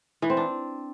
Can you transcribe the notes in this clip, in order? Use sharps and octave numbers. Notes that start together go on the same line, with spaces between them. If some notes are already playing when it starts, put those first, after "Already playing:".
E3
C4
D4